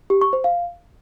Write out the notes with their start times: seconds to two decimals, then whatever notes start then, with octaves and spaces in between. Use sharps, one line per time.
0.10 G4
0.21 C#6
0.33 C5
0.44 F5